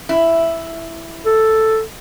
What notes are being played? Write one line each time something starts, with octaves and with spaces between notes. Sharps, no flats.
E4
A4